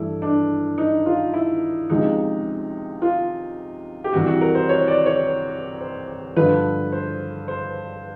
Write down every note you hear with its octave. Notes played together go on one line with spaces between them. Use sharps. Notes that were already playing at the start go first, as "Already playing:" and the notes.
Already playing: G2 E3 A3 E4
D4
D#4
F4
E4
C#2 C3 F3 G#3 D#4
F4
G4
C2 C3 E3 G3 F#4
F#4
A#4
C5
C#5
D5
C#5
C5
G2 D3 F3 B4
C5
C5